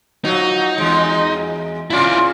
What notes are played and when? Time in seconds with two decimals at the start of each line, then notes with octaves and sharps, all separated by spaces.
0.25 F3 F#3 D#4
0.78 E2 G#3
1.90 C#3 E4 F4 D5